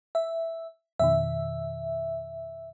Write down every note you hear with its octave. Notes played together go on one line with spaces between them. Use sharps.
E5
F2 B2 D#3 E5